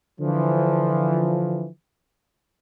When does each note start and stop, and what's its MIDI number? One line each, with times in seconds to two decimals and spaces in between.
0.20 1.68 50
0.20 1.68 52
0.20 1.68 53